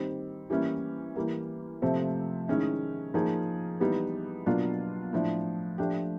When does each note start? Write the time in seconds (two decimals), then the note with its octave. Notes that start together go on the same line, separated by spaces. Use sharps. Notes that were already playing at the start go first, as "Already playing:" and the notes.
Already playing: D#3 G3 C4
0.50 E3 G3 A#3 C#4 E4
1.16 E3 G3 A#3
1.82 C3 F3 A3 C4
2.48 D#3 G#3 C#4 E4
3.14 F3 A#3 D#4 G#4
3.80 E3 G3 B3 D#4
4.46 B2 F#3 A#3 D4 F4
5.13 A2 F3 A3 D4
5.78 F3 A3 D4 G4